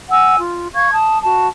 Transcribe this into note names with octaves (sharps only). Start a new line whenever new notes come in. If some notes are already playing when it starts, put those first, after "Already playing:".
F#5 G#5 E6
F4
F5 C#6 G#6
A5 D#6
F#4 A5